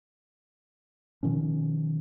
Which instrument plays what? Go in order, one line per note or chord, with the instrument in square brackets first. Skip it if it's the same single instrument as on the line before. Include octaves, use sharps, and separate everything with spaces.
[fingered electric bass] B2 D#3 F3 C#4